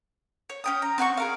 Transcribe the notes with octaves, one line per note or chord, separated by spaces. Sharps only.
C#5
C#4 G5 D#6
A#5
C4 F#4 G#5 C#6
G#4 A#4 F5